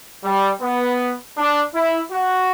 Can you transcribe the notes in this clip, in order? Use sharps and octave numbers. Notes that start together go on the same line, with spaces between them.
G3
B3
D4
E4
F#4